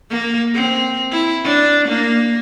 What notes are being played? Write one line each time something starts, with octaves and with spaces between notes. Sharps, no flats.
A#3
C4
E4
D4
A#3